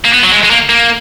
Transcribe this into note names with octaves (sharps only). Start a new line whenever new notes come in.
A#3
B3
F#3
G#3
G#3
A#3
A#3